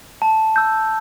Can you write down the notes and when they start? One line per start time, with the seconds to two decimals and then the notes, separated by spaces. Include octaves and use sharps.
0.22 A5
0.56 E6 G6